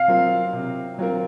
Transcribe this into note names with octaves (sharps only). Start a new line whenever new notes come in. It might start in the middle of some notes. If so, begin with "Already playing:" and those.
Already playing: C3 F5
F#3 C4 F4 A#4
C3
F#3 C4 F4 A#4